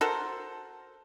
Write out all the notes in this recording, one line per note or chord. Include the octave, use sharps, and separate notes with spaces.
F#4 A4 A#4 C5